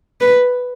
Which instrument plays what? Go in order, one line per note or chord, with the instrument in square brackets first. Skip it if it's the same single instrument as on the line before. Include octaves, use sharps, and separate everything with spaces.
[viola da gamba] B4